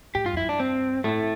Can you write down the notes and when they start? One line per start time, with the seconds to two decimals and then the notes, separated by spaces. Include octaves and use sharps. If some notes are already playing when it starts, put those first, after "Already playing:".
0.15 A2 G4
0.24 G2 F4
0.33 F2
0.37 G2 E4
0.49 D4
0.60 C4
1.04 A2 A3